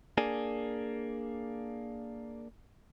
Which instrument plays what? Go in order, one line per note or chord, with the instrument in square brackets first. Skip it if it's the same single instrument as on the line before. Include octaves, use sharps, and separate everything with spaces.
[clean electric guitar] A#3 D4 G#4